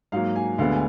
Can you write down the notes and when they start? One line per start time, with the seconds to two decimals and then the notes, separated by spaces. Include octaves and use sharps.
0.12 G#2 F#3 A#3 F5
0.36 G#5
0.58 D2 D3 G#3 B3 F5
0.72 G#5